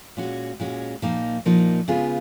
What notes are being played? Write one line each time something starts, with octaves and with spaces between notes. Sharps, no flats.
A#2 G#3 C#4 F#4
A#2 G#3 C#4 F#4
A#2 F3 A#3 D#4
A#2 F3 A#3 D#4
C#3 G#3 B3 F4 G#4